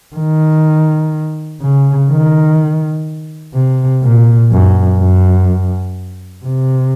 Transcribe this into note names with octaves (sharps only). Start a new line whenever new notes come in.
D#3
C#3
D#3
C3
A#2
F#2
F#2
C3